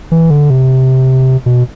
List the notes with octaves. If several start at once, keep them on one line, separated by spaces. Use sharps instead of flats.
E3
D3
C3
B2